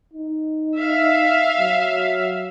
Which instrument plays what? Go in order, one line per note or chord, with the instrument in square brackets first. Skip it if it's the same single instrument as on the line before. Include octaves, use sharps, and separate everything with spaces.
[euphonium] D#4
[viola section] E5 F5
[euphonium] F#3